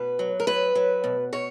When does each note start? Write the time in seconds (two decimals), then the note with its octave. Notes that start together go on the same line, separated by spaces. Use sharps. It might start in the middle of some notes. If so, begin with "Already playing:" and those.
Already playing: B2 B4
0.19 F#3
0.40 A#4
0.47 F#3 B4
0.75 F#3
1.04 B2
1.33 B2 C#5